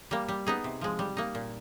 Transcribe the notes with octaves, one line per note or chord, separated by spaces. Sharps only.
G3 A#3
G3
B3 D#4 G#4
C3
F3 G#3
G3
A#3 D#4
A#2